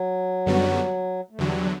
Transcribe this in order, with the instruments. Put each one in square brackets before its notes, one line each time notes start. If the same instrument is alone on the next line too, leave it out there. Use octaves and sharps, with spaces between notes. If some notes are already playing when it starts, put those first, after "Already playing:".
Already playing: [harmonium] F#3
[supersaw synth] F#2 D3 G3 B3 F#4
[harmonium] A3
[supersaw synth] E2 D3 F#3 [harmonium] G3